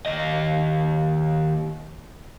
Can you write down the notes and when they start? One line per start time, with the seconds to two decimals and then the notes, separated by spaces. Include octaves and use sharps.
0.06 D#2 D#5